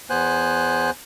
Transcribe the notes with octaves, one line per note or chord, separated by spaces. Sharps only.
E2 B3 C5 G#5 F#6